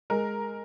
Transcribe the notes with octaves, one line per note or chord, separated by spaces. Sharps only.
G#3 A#4